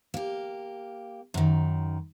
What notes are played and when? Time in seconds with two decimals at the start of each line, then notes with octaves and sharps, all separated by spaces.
0.14 A#3 G4
1.34 F#2 D#3